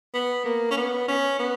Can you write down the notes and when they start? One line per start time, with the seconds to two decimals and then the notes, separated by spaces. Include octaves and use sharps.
0.14 B3
0.45 A#3
0.71 C#4
0.77 B3
1.08 C#4
1.39 B3